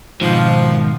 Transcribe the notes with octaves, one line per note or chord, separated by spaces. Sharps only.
G#2 B2 D#3 F3